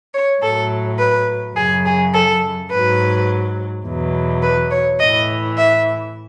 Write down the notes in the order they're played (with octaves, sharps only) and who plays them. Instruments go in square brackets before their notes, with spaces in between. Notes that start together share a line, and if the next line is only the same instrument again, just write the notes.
[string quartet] C#5
A2 F#3 A4
B4
F#2 C#3 F#3 G#4
G#4
A4
G#2 F#3 B4
E2 B2 F#3
B4
C#5
A2 E3 D#5
E5